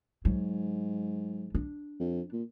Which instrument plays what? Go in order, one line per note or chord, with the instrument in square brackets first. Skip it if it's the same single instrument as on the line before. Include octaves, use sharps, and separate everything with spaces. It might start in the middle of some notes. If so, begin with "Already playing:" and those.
[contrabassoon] G#2 [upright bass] F#3
[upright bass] D4
[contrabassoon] F2
A#2